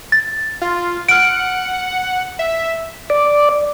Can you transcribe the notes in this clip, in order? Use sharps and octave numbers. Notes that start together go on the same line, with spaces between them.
A6
F4
F#5 F6 D7
E5
D5